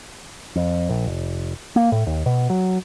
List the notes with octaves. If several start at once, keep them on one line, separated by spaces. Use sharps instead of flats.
F2
A#1
F1
A#3
A2
D#2
B2
F#3